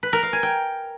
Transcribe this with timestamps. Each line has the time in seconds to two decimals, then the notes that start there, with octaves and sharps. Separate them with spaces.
0.03 B4
0.13 A#4
0.23 F5
0.33 G#5
0.43 G5